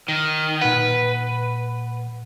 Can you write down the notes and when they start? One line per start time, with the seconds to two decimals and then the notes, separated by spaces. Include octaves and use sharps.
0.08 D#3
0.61 A#2 B4 F#5